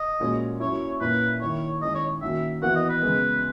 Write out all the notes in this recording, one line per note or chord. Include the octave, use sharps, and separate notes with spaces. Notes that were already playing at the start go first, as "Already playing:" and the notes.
Already playing: D#5
A#2 G#3 C#4 F#4
F#3 C#4 E4 C#5
A#2 A#3 C#4 E4 B4
D#3 A#3 E4 C#5
D#3 G#3 C#4 E4 D#5
C#5
D#3 A#3 C#4 F#4 E5
E3 B3 F#4 F#5
D#5
B4
C#3 G#3 B3